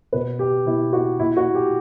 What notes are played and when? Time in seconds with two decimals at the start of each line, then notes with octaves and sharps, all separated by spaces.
0.13 B2 B4
0.39 G4
0.66 B2 E4
0.93 F#4
1.19 A#2 E4
1.37 F#4
1.54 G4